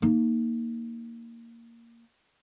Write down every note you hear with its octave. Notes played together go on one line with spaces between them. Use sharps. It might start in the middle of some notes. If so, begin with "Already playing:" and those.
A#3 D#4